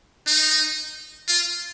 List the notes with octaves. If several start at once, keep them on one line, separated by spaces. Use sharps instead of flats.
D#4
F4